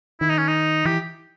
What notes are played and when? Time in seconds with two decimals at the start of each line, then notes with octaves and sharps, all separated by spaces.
0.20 D#3 E4
0.29 D#4
0.38 C#4
0.47 D#4
0.85 E3 G4